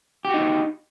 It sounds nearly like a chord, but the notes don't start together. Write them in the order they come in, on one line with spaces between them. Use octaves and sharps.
G4 F#4 D#4